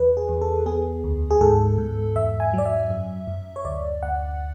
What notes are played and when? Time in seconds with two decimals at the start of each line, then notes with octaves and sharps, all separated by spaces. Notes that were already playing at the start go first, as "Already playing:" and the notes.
Already playing: E2 B4
0.17 G#4
0.29 E2
0.42 A4
0.66 B3 G#4
1.04 D2
1.31 G#4
1.41 G#2 A4
1.78 G#2
2.15 E2 E5
2.40 G#5
2.54 F#3 D5
2.65 E5
2.90 F#2
3.27 F#2
3.56 C#5
3.65 D2 D5
4.03 D2 F#5